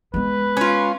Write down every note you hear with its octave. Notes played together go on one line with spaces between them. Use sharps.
G#3 B3 B4
C#4 F4